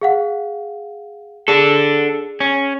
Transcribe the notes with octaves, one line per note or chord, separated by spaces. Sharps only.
G#4 F5 F#5
D4 G#4 A4
C#4